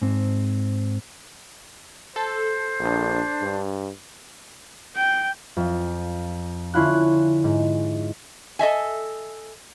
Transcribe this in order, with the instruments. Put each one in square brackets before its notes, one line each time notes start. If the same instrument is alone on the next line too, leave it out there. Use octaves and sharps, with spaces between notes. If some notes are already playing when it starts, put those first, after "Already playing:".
[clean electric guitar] G#2 C4
[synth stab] A4 [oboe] C5
[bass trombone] A#1 [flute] D4
[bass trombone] G2
[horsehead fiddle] G5
[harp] F2
D3 C#4 E4 F4 F#6
G#2
[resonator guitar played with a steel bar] A4 D#5 E5 G#5